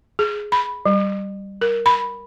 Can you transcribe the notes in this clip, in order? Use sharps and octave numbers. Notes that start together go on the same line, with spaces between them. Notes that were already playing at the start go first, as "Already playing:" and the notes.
G#4
B5
G3
A#4
B5